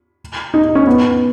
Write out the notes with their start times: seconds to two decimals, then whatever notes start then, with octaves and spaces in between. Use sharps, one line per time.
0.54 D#4
0.75 C#4
0.87 B3